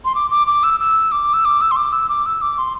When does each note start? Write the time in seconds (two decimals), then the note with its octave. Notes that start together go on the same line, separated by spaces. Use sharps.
0.05 C6
0.15 D6
0.31 D6
0.47 D6
0.63 E6
0.80 E6
1.12 D6
1.34 E6
1.45 D6
1.61 E6
1.71 C6
1.76 D6
1.92 E6
2.09 D6
2.26 E6
2.42 D6
2.58 C6